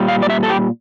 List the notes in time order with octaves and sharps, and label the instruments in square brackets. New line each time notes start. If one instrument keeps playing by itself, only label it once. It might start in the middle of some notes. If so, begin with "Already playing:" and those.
Already playing: [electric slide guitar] A#2 G3
F5
D5
E5
A4
G4